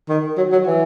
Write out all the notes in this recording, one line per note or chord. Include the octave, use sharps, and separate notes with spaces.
D#3
F#3
F#3
E3